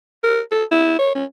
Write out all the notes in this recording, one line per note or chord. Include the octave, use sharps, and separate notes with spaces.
A#4
A4
E4
C#5
C#4